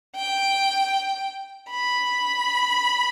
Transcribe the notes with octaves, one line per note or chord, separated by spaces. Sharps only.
G5
B5